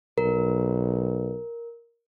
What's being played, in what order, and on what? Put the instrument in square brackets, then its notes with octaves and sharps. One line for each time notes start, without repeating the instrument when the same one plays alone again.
[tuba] B1 [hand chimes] A#4